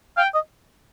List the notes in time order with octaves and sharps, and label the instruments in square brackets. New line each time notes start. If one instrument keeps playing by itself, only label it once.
[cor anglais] F5 [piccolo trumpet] G5
[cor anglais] D#5